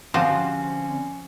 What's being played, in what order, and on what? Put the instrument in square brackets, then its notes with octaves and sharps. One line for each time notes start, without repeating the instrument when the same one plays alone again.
[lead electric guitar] D3 C4 [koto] F3 [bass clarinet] C#4 [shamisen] F#4 G4